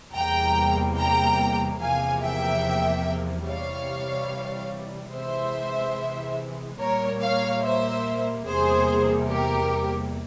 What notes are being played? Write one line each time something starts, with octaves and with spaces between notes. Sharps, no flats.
E2 C3 G3 A#3 G5 A#5
G5 A#5
E2 C3 F3 A#3 F5 G#5
E5 G5
C3 E3 G3 C#5 F5
C3 E3 G#3 C5 E5
A#2 G3 A#3 A#4 C#5
C#5 F5
C5 E5
E2 C3 G3 A#3 G#4 C5
G4 A#4